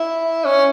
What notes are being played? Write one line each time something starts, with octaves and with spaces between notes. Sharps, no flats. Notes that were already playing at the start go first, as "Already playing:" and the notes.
Already playing: E4
C#4